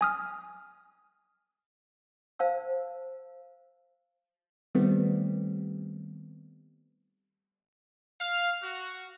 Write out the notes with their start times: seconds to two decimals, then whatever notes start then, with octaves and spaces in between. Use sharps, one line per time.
0.01 G#5 D#6 F6
2.39 C5 F5 A5 E6
4.75 D#3 G3 A3 B3 C4
8.20 F5
8.62 F#4